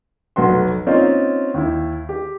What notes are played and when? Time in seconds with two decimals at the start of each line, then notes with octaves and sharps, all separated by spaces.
0.36 F1 B1 B3 F#4 C6
0.86 A#3 C4 C#4 D#4 F4
1.54 D#2 E4
2.09 G4